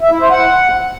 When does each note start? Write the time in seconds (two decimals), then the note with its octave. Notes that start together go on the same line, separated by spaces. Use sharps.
0.01 E5
0.11 E4
0.21 C5
0.31 F#5